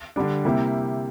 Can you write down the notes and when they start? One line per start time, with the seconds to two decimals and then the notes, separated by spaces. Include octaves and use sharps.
0.16 D3 G3 D4
0.45 C3 G3 A#3 E4 G4